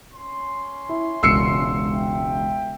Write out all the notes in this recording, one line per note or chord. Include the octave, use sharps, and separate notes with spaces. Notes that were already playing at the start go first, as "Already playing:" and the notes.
C#4 C6
E4
E1 C#2 E6 C7 C#7
E5 G5